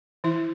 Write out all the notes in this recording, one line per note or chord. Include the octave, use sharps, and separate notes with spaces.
E3 E4 E5